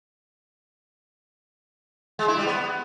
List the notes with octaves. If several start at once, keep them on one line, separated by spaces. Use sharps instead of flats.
G#3
E4
G3
B3